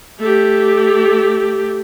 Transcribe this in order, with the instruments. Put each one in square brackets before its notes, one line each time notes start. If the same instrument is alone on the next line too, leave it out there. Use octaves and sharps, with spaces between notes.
[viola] A3 G4